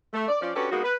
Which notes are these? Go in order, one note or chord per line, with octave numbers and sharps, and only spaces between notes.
A3
D5
F3 C#4 F4 D5
C#4 D4 F#4 G4 A4 B4
G#3 A#3 B3 D#4 F#4
B4